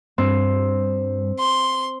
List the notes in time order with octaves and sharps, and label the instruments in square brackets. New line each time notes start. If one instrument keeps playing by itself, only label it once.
[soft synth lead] G2 [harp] C4
[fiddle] C6